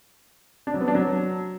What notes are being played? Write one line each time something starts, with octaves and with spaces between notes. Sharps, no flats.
D4
F#3
B3
D4
F#3